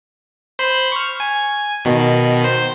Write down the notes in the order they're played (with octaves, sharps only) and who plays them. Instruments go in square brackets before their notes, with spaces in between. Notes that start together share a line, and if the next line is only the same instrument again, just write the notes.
[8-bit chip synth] C5 B5 B6
C#6 F6
G#5
B2 D#3
C5